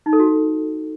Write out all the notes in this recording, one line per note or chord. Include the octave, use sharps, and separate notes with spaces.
D#4
A4
F#4